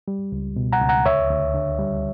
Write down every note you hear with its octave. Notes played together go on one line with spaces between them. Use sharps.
G3
C#2
B2
F#5 A#5
C#2
F#5 A#5
D2 C#5 E5
D2
D3
G3